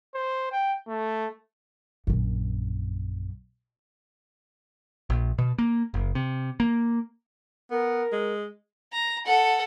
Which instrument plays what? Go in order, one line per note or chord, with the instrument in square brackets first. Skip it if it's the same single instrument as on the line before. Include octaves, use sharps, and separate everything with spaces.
[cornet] C5
G5
A3
[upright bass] A#1 F#2
[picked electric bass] A#1
B2
A#3
F#1
C3
A#3
[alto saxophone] B3 [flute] A#4
[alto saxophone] G#3
[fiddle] A#5
A4 F#5